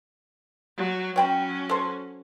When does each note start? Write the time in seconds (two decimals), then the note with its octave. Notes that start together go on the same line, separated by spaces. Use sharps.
0.77 F#3
1.16 F#3 C#4 C#5 G5 B5
1.69 A4 C5